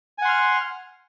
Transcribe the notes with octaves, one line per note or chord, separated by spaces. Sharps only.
F#5 G#5 C6 F6